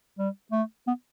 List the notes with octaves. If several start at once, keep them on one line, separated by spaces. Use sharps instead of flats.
G3
A3
B3